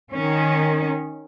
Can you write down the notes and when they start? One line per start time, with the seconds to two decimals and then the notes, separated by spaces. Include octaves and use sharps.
0.15 D#3 C#4